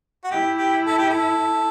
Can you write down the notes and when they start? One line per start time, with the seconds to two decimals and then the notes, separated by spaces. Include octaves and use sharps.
0.24 F#4
0.31 E4 G4
0.58 G4
0.86 A4
0.98 G4
1.10 A4